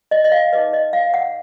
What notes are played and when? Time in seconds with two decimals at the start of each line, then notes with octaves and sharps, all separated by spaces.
0.11 D#5
0.25 D#5
0.32 F5
0.52 D#4 G#4 B4 D#5
0.73 D#5
0.93 F5
1.14 F#5